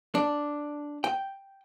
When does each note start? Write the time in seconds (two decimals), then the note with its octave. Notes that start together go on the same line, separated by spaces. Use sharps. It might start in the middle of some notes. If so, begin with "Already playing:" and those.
0.15 D4
1.04 G5